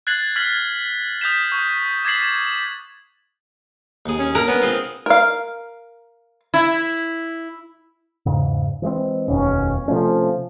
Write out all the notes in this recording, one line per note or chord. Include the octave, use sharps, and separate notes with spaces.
F#6 G#6 A6 C7 F#7
F6 G#6 A6 B6 C7 F#7
D#6 G6 B6 E7
C#6
D6 G#6 A6 B6 C7 F#7
D#2 G#4
C#4
A#4 F#5
B3 C#4
C4 F4 G#4
A#4 F5
E4
E2 G#2 C#3
E3 G#3 C4
F1 D#2 B2 C#4
C3 F3 A3 C#4